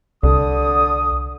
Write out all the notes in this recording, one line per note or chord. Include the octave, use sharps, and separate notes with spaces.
C2 D3 D#6